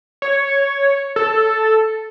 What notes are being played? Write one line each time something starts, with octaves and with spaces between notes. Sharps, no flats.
C#5
A4